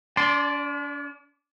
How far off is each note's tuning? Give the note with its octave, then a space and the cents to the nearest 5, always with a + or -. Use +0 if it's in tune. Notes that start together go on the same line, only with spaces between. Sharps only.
D4 -45 D5 -5 C6 +0